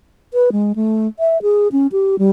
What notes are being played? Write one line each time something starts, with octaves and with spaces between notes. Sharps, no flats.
B4
G#3
A3
E5
G#4
C#4
G4
G3